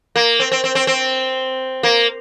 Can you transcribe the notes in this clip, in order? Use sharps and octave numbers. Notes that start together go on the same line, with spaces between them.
A#3
C4
C4
C4
C4
C4
A#3